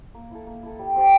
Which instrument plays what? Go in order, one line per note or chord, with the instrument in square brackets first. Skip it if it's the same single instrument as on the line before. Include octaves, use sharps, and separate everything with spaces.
[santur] A#3
E4 A4
A#3
E4 A4
G3
C4 G4 D5